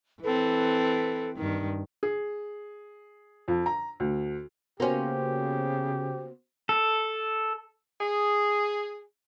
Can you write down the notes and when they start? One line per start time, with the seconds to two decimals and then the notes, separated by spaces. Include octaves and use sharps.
0.22 E3 C4 A4 B4
1.37 G2 D#3
2.03 G#4
3.48 F2
3.66 A#5
4.00 D2
4.80 C#3 A#3 B3 C#4 F#4 G4 C5
6.69 A4
8.01 G#4